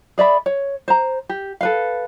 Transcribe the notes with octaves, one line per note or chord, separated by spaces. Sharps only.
G#4 D5 E5 B5
C#5
C5 A#5
G4
A4 B4 F5